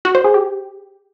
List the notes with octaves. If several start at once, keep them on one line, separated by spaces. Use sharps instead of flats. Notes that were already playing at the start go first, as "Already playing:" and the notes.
F#4
C5
G#4
G4